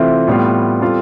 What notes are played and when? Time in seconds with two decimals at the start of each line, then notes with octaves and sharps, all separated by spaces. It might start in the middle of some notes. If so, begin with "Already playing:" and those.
Already playing: C3 E3 A3 C4 F4
0.27 A2 G3 B3 F4
0.81 G3 C4 F4 A4